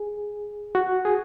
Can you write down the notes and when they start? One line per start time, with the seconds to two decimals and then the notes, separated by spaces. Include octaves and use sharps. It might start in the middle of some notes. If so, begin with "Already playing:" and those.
Already playing: G#4
0.75 F#4
1.05 G#4